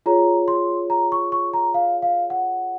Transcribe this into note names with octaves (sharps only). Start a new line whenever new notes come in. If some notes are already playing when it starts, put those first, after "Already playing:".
F4 G#4 C#5 A#5
C6
A#5
C#6
C#6
A#5
F5
F5
F#5